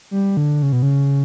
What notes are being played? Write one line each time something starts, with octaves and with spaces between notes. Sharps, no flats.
G3
D3
C#3
B2
C#3